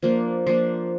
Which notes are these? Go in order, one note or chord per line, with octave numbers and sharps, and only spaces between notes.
F3 A#3 D4
F3 A#3 D4